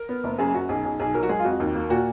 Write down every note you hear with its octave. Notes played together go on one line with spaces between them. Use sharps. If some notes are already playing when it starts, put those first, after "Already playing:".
Already playing: A#4
B3
F#1
F#2 G#4
F#2 F#4
B1 G#4
B1
B1 G#4
F#3 A#4
F#4
G#3 G#4
F4
F2 F#4
D#2
A#3
A#2 F#4